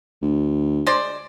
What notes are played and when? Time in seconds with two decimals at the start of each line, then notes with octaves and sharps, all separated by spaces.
0.22 D2
0.87 G#3 C5 D5